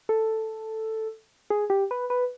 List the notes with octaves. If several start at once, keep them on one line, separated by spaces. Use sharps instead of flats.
A4
G#4
G4
B4
B4